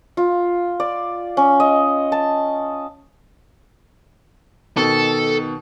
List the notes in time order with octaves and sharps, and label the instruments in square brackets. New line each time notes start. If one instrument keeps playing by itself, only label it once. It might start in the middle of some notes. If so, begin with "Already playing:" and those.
[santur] F4
D5
C#4
D#5
A5
[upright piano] B2 D#3 [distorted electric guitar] A4